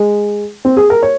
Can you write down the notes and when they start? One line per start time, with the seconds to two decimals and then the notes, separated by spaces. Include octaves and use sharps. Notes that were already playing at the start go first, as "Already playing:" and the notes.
Already playing: G#3
0.65 C4
0.77 G#4
0.90 A#4
1.03 C#5